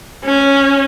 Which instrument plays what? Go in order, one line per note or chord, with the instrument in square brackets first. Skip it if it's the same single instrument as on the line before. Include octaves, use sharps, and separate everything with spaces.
[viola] C#4